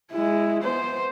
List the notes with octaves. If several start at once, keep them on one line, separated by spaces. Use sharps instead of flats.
G#3 E4
B3 C5